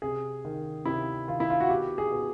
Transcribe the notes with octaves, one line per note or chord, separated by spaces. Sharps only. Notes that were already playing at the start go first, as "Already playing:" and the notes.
C3 G#4
D#3
C3 E4
D#3 F4
E4
F4
F#4
B2 G4
G#4
B2